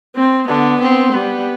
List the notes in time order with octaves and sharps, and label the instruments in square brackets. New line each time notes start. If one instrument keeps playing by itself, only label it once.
[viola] C4
[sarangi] D3 [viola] B3
[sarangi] C4
[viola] G3 [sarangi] B3